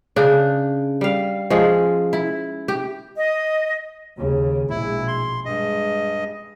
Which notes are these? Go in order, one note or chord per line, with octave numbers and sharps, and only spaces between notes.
C#3 D4
G3 F5
F3 G#3 C#4
E4
G4
D#5
D#2 C#3
A#1 B2 G#3 E4
C6
G2 G#3 D#5